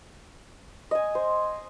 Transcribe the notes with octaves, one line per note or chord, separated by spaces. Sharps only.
D#5 G#5
C5